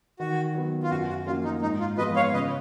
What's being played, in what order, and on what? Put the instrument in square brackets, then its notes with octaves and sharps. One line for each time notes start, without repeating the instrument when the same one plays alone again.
[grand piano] D#3 [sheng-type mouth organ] F#4
[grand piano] F#3 B3
[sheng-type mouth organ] F4
[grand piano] F#2 [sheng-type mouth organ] F#4
[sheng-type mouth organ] F#4
[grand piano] F3 A#3 C#4 F#4 [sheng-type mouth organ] F4
[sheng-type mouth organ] D#4
[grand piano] G#2 [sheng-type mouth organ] D#4
[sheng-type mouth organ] F4
[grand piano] F3 G#3 B3 F4 [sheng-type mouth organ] B4 D#5
[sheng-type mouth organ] C#5 F5
[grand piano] C#3 [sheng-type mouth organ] B4 D#5